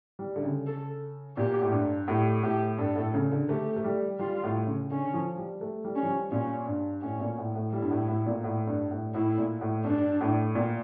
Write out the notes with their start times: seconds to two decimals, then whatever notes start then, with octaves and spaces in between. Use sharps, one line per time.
0.19 G3
0.36 D3
0.43 C#3
0.67 A4
1.37 A#2 G4
1.62 A2
1.72 G2
2.07 A2 G4
2.43 A2 G4
2.78 G2 A4
2.96 A2
3.14 C#3
3.31 D3
3.49 A3 G4
3.76 A3
3.84 G3
4.19 G3 F4
4.43 A2
4.67 C#3
4.90 D3 C#4
5.14 F3
5.37 G3
5.61 A3
5.84 G3
5.96 C#4
6.03 F3
6.08 G3
6.31 A#2 C#4
6.67 G2
7.02 A2 C#4
7.20 A#2
7.38 A2
7.55 A2
7.73 G3 E4
7.82 G2
7.91 A2
8.08 A2
8.26 A#2
8.44 A2
8.67 G2
8.91 A2
9.14 A2 E4
9.38 A#2
9.61 A2
9.84 G2 D4
10.21 A2
10.55 A#2